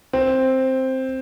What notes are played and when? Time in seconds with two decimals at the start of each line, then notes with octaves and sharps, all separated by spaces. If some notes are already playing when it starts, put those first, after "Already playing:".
0.13 C4